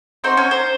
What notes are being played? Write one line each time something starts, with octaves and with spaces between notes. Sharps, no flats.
C4 D#4 F#4 C5
C#4 C#5
C5